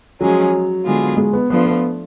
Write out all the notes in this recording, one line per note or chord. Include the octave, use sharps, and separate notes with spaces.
F3 F#3 G#3 C#4 G#4
D3 G#3 B3 F4 G#4
G#3
B3
F3 A3 B3 D4 F4
B3